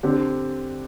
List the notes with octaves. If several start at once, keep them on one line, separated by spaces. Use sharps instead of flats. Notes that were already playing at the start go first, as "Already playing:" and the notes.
D3 C4 G4